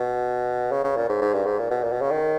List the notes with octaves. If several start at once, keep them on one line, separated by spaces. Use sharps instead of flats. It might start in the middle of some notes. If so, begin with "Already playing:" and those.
Already playing: B2
C#3
C#3
A#2
G#2
G#2
G2
G#2
A#2
B2
A#2
B2
C#3
D#3